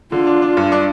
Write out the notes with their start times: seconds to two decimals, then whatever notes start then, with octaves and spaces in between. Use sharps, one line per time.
0.12 D3 F4
0.27 D4
0.42 D4
0.57 G2
0.72 D4